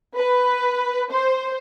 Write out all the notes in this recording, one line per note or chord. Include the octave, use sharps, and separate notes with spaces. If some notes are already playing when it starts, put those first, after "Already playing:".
B4
C5